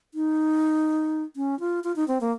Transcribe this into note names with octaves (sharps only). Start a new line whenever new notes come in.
D#4
C#4
F4
F4
D#4
C4
A#3